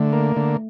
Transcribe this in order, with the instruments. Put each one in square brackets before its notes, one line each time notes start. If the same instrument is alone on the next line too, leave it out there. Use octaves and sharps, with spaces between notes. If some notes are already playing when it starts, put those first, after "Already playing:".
Already playing: [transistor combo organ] D3 [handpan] A3
[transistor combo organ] A#3
D3